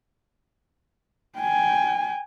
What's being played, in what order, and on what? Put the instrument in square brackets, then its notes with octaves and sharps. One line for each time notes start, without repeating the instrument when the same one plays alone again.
[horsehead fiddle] G5 G#5